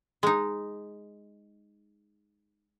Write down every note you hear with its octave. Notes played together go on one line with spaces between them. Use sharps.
G#3 D#4